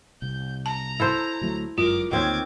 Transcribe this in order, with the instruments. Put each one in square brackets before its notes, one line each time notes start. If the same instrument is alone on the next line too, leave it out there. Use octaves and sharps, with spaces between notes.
[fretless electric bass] C2 [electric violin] G6
[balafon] A5 [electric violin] A#5
[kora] E4 A4 C5
[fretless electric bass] D2 F#3 A3
[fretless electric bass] G1 F#2 G#3 [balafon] F4 [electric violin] A#4 D6
[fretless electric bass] D2 A#3 [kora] D#3 C4 C#4 [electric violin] D6 G#6